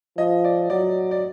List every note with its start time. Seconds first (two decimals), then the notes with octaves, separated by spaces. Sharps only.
0.17 F3 D#5
0.44 D5
0.70 F#3 D5
1.11 D5